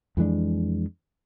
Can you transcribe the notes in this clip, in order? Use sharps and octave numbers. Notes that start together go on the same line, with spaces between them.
F2 E3 G#3 D4